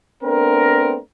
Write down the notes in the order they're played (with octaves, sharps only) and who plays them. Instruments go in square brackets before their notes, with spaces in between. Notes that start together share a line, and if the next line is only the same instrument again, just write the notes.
[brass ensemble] A3 B3 C4 D4 A#4